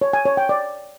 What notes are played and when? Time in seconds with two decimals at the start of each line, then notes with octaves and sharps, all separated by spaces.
0.01 C#5
0.13 G#5
0.25 C#5
0.37 G5
0.49 D5